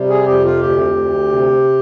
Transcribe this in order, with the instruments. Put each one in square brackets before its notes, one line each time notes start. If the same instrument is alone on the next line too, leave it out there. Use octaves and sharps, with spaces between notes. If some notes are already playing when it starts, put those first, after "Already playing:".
Already playing: [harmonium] C3 G3
G#4
F2 G4
F4
D2 G4
D2
C3